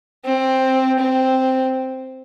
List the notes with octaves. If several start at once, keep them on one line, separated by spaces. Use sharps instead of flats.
C4
C4